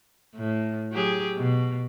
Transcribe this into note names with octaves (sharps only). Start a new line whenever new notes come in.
A2
F#3 G4 G#4
B2